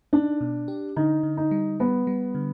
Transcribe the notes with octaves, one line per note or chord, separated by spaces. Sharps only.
D4 D#4
B2
G4
D3 D#4
D3
D#4
G3
G3 B3
G3
D3